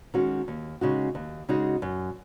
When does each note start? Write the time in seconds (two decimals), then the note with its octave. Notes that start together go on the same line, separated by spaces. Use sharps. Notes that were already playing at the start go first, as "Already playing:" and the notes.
0.14 D#3 G#3 C#4 F#4
0.48 D#2
0.81 C#3 G#3 D#4 F#4
1.15 D#2
1.49 C#3 G#3 D#4 F#4
1.82 F#2